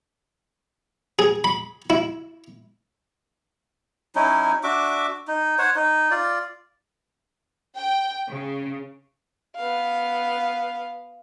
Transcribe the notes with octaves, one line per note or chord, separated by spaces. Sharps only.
G#4
B5
E4
F#3 C#4 D#4 E4
D4 F#4 E5 D6
D#4
C5 C#5 F#5
D#4
F4 D5
G5
C#3
B3 F5